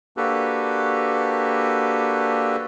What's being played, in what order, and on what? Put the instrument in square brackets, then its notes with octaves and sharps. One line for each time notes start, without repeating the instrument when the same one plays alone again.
[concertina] A#3 D4 F#4 G4 A4 B4